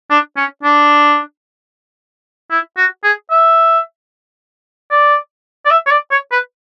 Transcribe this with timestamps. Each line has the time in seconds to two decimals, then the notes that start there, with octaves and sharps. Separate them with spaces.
0.10 D4
0.37 C#4
0.63 D4
2.51 E4
2.77 F#4
3.04 G#4
3.31 E5
4.91 D5
5.66 D5
5.71 E5
5.86 C#5
5.91 D5
6.11 C#5
6.32 B4